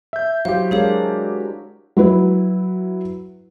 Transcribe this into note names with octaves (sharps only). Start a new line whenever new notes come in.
E5 G6
F#3 E4 G4 C5 F5
G#3 D4 G#4 A#4 C#5 F5
F#3 E4 B4